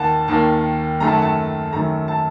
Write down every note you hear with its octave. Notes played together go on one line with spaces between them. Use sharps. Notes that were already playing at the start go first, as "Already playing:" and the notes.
Already playing: D#2 D#3 A#3 F#5 A5
D#2 D#3 A#3 A5
F#2 D#3 A3 A#5
A5
F#5
A5
F#2 D#3 A3 A#5
A5